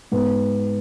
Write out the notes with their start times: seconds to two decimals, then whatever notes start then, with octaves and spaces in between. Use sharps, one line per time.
0.12 G#2 B3